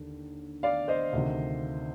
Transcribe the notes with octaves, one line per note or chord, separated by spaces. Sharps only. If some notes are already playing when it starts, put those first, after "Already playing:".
Already playing: D#2 D3
D5 F5
C5 D#5
D2 C3 D#3